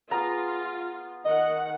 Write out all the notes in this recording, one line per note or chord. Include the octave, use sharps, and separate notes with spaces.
B3 F4 G#4 A#5
D#3 D#5 F#5